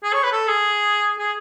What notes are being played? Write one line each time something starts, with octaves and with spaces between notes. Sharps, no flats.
G#4
C#5
B4
A4
G#4
G#4